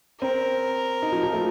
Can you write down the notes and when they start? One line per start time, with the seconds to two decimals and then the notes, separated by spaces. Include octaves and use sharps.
0.21 C4 A#4
1.02 D#4
1.12 F3
1.23 F3
1.33 A3